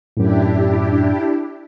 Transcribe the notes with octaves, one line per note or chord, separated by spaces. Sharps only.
F#2 A2 D4 E4 G4